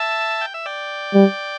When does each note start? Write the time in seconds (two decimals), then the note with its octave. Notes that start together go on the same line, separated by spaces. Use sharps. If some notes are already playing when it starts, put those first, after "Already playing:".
Already playing: E5 A5
0.41 G5
0.54 E5
0.66 D5 G5
1.14 G3